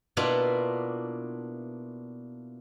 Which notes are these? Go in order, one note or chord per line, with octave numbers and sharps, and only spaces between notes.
B2 A#3 B3 D4 E4 F4